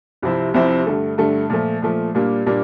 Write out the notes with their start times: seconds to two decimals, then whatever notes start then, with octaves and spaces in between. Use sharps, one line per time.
0.22 C2 C3 F3 C4 E4
0.54 C2 C3 F3 C4 E4
0.87 G2 D3 A3
1.18 G2 D3 A3
1.50 A#2 F3 A3
1.82 A#2 F3 A3
2.15 A#2 G3 A#3 D4
2.46 A#2 G3 A#3 D4